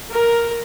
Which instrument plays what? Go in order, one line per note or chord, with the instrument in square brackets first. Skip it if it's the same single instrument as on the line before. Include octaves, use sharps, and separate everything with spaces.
[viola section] A#4